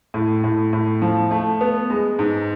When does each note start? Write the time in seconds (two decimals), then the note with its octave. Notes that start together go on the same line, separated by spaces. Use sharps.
0.14 A2
0.44 A2
0.73 A2
1.02 F3
1.31 A3
1.61 B3
1.90 G#3
2.19 G#2